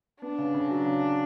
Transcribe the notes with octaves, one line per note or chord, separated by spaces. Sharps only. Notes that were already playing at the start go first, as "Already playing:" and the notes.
B3 D4
C#3
C#3
F#3
C#3